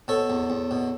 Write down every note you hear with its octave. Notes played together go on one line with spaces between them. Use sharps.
B2 A4 C#5
E2
E2
B2